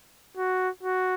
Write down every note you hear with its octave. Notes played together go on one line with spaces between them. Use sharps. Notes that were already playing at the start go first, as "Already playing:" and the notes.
F#4
F#4